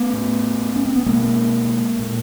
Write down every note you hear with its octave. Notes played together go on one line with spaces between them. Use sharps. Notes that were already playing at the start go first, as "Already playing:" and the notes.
Already playing: A3 B3
A2
C#4
C4
B3
B2 G#3 A#3
A#2